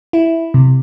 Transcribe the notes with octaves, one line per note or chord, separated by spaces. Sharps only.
E4
C3